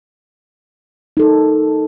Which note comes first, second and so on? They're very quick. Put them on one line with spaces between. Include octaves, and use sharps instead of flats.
D#4 A4 A#4